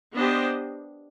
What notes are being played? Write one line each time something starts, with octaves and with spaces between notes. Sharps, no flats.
B3 D4 G4 C5 D#5